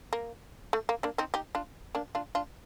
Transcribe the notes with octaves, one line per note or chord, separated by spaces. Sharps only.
A#3
A3
A#3
A#3 D4
C4 D#4
D#4 G4
D4 F4
A#3 D4
D4 F4
D4 F4